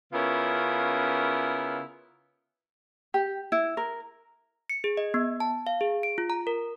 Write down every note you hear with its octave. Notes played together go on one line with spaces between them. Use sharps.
C#3 B3 C#4 E4 F4 A#4
G4
E4
A#4
C#7
G#4
D#5
B3
A5
F5
G#4
D7
F4
A#5
A#4